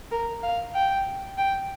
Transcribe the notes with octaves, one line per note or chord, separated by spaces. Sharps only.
A#4
F5
G5
G5